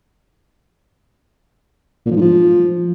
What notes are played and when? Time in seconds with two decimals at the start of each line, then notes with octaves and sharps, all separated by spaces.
2.06 A#2
2.11 F3
2.16 G#2
2.21 F3